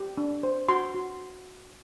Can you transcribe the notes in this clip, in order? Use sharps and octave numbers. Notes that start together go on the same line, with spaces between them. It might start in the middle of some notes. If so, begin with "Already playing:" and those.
Already playing: G4
D4
C5
F#4 C6
F#4